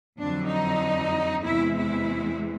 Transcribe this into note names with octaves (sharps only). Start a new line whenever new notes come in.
F2 D3 F#3 D4
D#4
E2 C3 E3 G#3 E4
E4